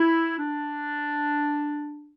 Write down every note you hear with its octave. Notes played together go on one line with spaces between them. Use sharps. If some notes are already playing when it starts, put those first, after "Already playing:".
Already playing: E4
D4